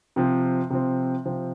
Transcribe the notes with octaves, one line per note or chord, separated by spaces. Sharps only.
C3 F3 C4
C3 F3 C4
C3 F3 C4